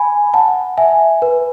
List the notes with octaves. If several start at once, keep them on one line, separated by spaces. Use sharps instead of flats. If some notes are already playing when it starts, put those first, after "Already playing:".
Already playing: G#5 B5
F#5 A5
E5 G#5
B4